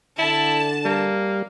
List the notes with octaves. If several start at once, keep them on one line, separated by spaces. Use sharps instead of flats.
D3 E4 A5
G3 A#3